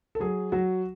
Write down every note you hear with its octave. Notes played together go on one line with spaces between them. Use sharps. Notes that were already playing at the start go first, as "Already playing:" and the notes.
A4
F#3 G#4
F#3 F#4